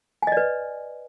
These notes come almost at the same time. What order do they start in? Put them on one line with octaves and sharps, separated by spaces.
G#5 D#5 D5 B4